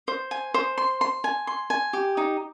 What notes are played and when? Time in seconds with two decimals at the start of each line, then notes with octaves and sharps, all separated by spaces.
0.08 C5
0.31 G#5
0.54 C5
0.78 C6
1.01 C6
1.24 G#5
1.47 C6
1.70 G#5
1.93 G4
2.17 D#4